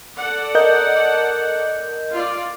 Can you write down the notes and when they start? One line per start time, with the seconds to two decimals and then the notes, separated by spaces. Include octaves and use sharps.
0.16 A4 D5 F#5
0.55 A#4 D#5 G6
2.12 F4 D5